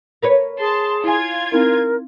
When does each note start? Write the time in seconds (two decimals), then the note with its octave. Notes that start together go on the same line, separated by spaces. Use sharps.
0.22 A#4 B4 C#5
0.60 G#4 A5 C6
1.04 E4 F4 G#5 G#6
1.52 C4 D#4 E4 A#4